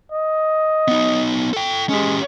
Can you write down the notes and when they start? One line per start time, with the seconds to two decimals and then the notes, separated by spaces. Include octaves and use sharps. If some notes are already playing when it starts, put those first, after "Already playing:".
0.12 D#5
0.88 B3 D#4
1.53 A4 G5
1.89 G#3 C#4 G4